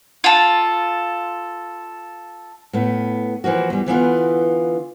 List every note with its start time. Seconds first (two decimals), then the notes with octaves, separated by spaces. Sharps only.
0.24 F4 A4
2.73 A2 B3
3.44 E3 F3 A#3 F#4
3.70 E2 G3
3.86 D3 E3 B3 F4